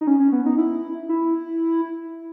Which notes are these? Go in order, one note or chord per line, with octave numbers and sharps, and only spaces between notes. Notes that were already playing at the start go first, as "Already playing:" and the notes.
D#4
C#4
C#4
B3
D#4
E4
E4